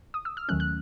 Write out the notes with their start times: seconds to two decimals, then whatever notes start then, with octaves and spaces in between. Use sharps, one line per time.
0.14 D#6
0.25 E6
0.37 F6
0.48 D#2 D#3 F#3 A3 C#4 F#6
0.60 F#6